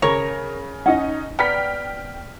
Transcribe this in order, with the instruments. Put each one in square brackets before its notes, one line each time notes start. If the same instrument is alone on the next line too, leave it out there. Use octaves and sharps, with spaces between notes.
[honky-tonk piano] C#3 A#6 F7 [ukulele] A#4 [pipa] C#5
[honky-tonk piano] C#4 D#4 D#5 [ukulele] F#5
[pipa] B3 [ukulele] D5 A#5 [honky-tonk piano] G5 F6 B6